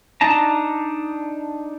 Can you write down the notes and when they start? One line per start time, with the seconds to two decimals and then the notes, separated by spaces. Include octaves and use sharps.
0.21 D4 D#4 A5 A#5